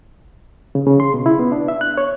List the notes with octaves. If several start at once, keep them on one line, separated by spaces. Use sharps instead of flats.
C#3
C#3
C6
B2
E4
B3
D4
E5
F#6
C#5